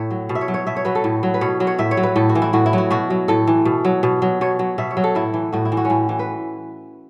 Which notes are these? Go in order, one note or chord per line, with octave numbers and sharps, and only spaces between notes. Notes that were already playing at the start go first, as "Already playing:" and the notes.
Already playing: A2 C#5 E5
F#3
B2
E5
C#5
F#3
C#5
B2 E5
C#5
F#3 B4
A4
A2
F#3
B4
B2 C#5
F#3
C#5
A2 E5
C#5
F#3
B4
A2 A4
F#4
E3
E4
A2 F#4
E4
F#3
F#4
B2 F#4
F#3
A2 A4
E3
B2
F#3
B2
F#3
B2 C#5
F#3
B2 E5
C#5
F#3
A4
A2 E4
E3
A2 F#4
E4
E3
F#4
C#4
A2 E4
E3
B4